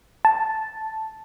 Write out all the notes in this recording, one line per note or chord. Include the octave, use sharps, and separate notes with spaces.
A5